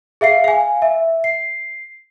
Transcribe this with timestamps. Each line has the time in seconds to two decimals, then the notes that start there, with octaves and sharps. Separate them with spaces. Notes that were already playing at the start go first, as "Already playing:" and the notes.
0.21 G#4 E5 F5 C7
0.44 F5 G#5
0.82 E5
1.24 C7